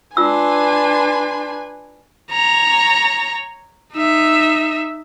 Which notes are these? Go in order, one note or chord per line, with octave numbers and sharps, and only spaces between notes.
D4 F4 B4 G#5 C6 E6
C#5 A#5
D#4 E5